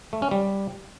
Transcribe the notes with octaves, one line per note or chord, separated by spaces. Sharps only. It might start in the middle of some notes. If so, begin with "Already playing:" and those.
A3
C#4
G3